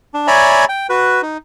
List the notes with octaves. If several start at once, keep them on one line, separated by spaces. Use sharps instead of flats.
D4
C#5 D5 E5 G#5 A#5 B5
G5
F#4 B4
D#4